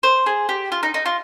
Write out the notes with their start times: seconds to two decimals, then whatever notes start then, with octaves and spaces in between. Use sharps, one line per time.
0.03 C5
0.26 G#4
0.49 G4
0.72 F4
0.83 D#4
0.94 D#4
1.06 F4